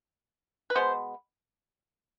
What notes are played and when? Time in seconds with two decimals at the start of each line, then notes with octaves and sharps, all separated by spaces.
0.70 B4
0.75 B2 G#3 B3 C5